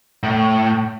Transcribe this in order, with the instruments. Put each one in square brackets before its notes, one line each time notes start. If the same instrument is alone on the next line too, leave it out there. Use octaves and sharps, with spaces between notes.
[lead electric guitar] A2